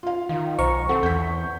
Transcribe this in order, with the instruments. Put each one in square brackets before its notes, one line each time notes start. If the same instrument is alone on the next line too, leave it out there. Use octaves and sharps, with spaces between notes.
[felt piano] F4 F5
[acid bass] D#3 [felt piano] F4 [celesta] F5
[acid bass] B1 [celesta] C5 [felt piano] A#5 [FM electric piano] C#6
[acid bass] C4 [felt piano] A4 [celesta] F#5
[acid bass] E2 [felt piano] G6 B6